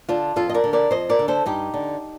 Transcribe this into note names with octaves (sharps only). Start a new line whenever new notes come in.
D3 D4 F4
F2 F4 A4
D#5
A#4 D5
D3
A#4 D5
F2 C5 D#5
A#4 D5
D3
A4 C5
G2 D#4 G4
D3